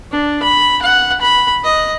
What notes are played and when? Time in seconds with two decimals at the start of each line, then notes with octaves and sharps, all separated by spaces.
0.12 D4
0.42 B5
0.82 F#5
1.21 B5
1.64 D#5